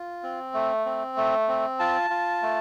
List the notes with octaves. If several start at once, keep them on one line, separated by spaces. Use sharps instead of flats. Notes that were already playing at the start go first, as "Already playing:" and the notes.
Already playing: F4
C4
A3
C4
A3
C4
F4 A5
F4
A3